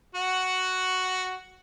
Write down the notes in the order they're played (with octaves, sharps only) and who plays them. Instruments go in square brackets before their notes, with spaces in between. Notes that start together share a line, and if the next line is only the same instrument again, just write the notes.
[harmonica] F#4 F#5